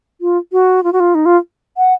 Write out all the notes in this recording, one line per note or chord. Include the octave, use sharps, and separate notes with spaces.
F4
F#4
F4
F#4
F4
D#4
F4
F#5